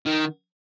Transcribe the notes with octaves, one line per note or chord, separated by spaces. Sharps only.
D#3